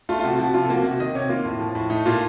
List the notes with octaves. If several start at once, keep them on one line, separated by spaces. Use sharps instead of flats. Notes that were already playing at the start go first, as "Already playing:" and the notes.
A3 F4
F4
C3 F#4
F3 F#4
C3 F4
A4
A#3 F#4
C3 F#4
D#3 D#5
C3 C#5
A#3 F4
A2
F3
A2
A3 D#4
A#2 F4